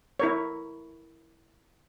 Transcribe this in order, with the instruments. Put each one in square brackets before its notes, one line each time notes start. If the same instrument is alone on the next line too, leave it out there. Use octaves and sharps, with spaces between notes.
[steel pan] E4 A#4 C#5